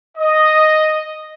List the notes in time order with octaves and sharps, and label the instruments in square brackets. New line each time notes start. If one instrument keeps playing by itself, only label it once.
[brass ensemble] D#5